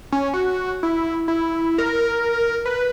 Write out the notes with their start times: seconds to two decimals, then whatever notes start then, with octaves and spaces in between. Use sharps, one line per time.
0.12 C#4
0.34 F#4
0.83 E4
1.28 E4
1.78 A#4
2.65 B4